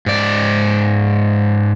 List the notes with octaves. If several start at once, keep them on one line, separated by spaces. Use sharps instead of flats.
G#2 D5